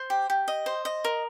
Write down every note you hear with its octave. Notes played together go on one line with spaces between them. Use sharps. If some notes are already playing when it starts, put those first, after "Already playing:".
Already playing: C5 C6
G4
G4
D#5
C5
D#5
A#4